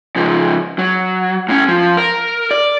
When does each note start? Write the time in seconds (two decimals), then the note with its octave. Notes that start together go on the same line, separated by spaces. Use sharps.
0.16 C#3 F3
0.79 F#3
1.49 A2 C#4
1.68 F3
1.97 A#4
2.51 D5